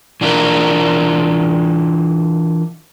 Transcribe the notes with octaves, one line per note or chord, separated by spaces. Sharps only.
E3 D4 F4 A#4